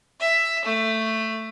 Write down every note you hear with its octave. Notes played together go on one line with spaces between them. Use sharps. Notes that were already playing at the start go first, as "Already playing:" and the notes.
E5
A3